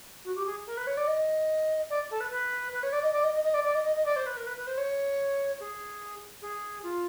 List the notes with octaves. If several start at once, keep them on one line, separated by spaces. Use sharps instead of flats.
F#4
G4
G#4
A#4
B4
C#5
D5
D#5
D5
A4
B4
B4
B4
C#5
D5
D#5
D5
D#5
D#5
D#5
D5
D5
D#5
D#5
D#5
D5
C5
B4
A#4
B4
B4
C5
C#5
G#4
G#4
F4